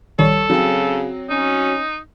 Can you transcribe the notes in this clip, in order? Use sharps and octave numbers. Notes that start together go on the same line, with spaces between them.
A#1 D#3 G3 A4 C#5
C#3 F#3 C4
C#4 D#4